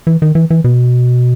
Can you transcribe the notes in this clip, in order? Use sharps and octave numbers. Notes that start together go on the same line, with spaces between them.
E3
D#3
E3
E3
B2